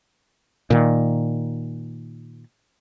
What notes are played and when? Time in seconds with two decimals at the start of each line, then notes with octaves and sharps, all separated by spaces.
0.70 A#2 D#3